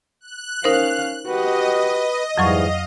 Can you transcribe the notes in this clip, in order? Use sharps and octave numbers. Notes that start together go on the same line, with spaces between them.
F#6
C#4 D#4 A#4 C5 F5
F#4 G4 B4 D#5
F2 G#2 E3 F#3 G3 F5 C#6